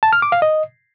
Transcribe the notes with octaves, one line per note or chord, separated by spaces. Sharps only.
A5
F6
D6
F5
D#5